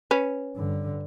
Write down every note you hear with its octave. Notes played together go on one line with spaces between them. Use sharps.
C#4 B4
G2 D3